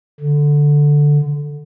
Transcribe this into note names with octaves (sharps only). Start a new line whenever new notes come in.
D3